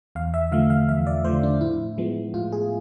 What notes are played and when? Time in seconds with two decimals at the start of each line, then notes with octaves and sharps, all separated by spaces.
0.15 E2 F5
0.34 E5
0.52 D3 F3 A3 F5
0.70 F5
0.89 E2 E5
1.07 D5
1.24 D3 F3 A3 C5
1.43 D4
1.61 A2 E4
1.98 F3 G#3 B3
2.34 A2 F4
2.52 G#4